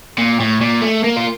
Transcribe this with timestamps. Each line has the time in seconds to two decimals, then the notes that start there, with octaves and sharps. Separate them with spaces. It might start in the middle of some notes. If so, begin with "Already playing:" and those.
0.18 A#2
0.40 A2
0.61 A#2
0.82 A3
1.04 A#3
1.17 F4